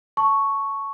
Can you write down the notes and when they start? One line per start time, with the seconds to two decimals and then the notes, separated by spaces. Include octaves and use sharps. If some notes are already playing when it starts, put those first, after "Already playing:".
0.17 A5 C#6